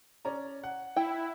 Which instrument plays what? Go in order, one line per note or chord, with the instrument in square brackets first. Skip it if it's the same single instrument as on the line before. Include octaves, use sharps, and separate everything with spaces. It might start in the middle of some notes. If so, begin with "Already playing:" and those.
[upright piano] C#4 D5 A#5
F#5
[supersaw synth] E4 [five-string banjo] G5